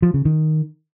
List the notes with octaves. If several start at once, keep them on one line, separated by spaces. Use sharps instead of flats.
F3
C#3
D#3